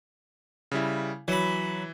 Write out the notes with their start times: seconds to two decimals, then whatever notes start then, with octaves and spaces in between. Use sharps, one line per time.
0.72 C#3 G3 E4
1.28 E3 F#3 B5